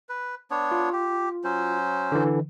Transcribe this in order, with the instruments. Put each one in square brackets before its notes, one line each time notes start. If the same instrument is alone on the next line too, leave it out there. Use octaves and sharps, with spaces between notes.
[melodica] B4
B3 D4 C#5
[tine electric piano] F4
[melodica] G4
F#3 C#4 C5
[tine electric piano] D3 E3